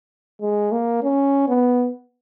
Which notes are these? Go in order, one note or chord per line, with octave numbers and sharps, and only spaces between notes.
G#3
A#3
C#4
B3